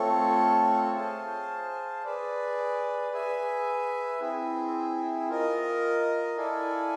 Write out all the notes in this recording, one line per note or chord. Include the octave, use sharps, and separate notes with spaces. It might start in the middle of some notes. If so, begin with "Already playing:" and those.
Already playing: A3 C4 F4 A4 C#5
G#4 C5 F5 A5
G#4 B4 D5
G#4 B4 E5 G#5
C4 E4 G#4
F4 A#4 D#5
E4 A4 D5 F5 G#5